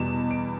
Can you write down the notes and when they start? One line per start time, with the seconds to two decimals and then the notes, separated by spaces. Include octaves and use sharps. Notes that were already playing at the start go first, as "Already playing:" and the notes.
Already playing: E2 B2 G3 E7
0.31 D7